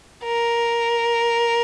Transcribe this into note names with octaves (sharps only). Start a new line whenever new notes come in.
A#4